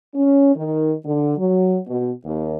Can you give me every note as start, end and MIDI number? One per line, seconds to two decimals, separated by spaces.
0.14 0.54 61
0.55 0.93 51
1.04 1.33 50
1.37 1.78 54
1.88 2.11 47
2.24 2.57 39